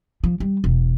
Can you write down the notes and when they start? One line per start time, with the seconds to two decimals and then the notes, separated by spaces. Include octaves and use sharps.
0.24 F3
0.40 G3
0.64 E1